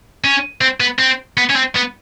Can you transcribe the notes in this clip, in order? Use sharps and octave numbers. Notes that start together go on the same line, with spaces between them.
C#4
C4
B3
C4
B3
C#4
C4
B3